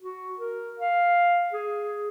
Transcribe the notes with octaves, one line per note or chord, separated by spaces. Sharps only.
F#4
A#4
F5
G#4